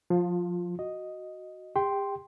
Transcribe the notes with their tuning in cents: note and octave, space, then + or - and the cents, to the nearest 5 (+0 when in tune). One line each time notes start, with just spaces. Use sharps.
F3 +25 F4 +0
F#4 +0 D#5 +0
G4 +40 G5 +0 C6 +0